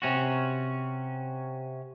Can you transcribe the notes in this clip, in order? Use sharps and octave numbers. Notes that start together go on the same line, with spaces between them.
C3 C#4 F#4